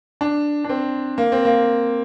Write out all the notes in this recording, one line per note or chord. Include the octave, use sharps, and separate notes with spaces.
D4
D4
C4
A#3
C4
A#3